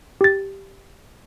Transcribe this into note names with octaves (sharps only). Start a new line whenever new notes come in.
G4 A6